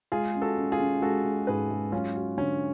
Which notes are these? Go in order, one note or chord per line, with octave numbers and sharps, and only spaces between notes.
G#3 F4 G#4
C#4
F#4 A4
C#4
F4 G#4
C#4
G#3 F#4 A4
G#3
G#2 G#4 B4
G#3
F#3 C#4 F4
F#4
D3 C#4